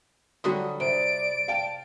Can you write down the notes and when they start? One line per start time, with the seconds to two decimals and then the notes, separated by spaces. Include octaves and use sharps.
0.44 D3 F#3 G3 F#4 D#6
0.80 C3 D5 D7
1.48 F5 G5 A5